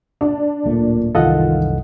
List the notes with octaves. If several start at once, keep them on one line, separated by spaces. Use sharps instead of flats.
D4
D1 A#2 A3
C2 F#2 D#3 E3 F4 A4 D#5 F#5